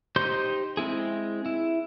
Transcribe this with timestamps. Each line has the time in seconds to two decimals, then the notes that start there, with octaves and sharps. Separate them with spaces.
0.16 D#4 G4 C5 C6 G6
0.77 G#3 C4 E4 G#4
1.46 E4